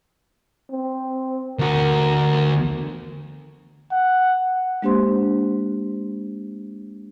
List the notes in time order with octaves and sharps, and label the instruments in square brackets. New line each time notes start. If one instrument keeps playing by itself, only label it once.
[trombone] C4
[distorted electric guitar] D2 F#4 [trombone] A#4
[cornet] F#5
[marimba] G#3 A#3 D4 G4 C5 C6